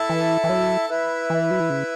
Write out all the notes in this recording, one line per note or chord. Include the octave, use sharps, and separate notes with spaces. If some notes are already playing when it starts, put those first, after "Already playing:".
Already playing: E4 A4 E5 A5
E3
E3
F#3
E4 B4 E5
E3
F#3
E3
C#3